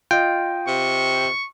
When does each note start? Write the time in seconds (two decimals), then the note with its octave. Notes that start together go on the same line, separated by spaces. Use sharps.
0.11 F4 D#5 G5
0.67 C3 C#6